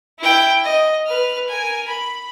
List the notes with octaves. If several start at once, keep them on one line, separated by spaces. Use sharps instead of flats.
E4 G5
D#5
B4 F6
A#4 G#5
B5